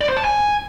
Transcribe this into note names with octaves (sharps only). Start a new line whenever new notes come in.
D5
C5
A5
G#5